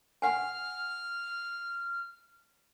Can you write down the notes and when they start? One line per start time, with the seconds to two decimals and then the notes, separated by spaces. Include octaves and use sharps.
0.22 F#5 G#5 F6